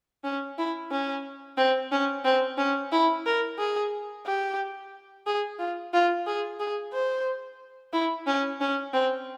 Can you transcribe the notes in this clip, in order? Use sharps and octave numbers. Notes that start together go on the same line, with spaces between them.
C#4
E4
C#4
C4
C#4
C4
C#4
E4
A#4
G#4
G4
G#4
F4
F4
G#4
G#4
C5
E4
C#4
C#4
C4